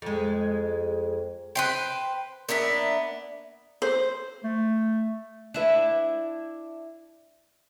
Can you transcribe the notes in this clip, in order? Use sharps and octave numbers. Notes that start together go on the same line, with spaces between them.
F2 G#3
B4 C5 G5
A#3 B3 D4 E5
C5
A3
D4 E4 B4